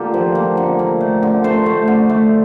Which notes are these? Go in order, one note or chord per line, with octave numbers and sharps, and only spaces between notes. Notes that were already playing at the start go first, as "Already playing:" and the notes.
Already playing: D3 A#3 F4 G4 A4
F3
A#3
D3
A#3
A3
D3
A3 A4 C5
A3
D3
A3